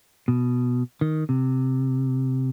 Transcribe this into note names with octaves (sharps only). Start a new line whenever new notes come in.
B2
D#3
C3